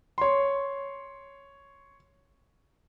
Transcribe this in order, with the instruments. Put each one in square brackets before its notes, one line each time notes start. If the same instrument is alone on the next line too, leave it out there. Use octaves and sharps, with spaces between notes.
[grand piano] C#5 C6